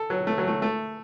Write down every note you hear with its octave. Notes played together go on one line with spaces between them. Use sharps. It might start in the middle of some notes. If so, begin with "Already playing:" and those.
Already playing: A4
F#3
A3
F#3
A3
A3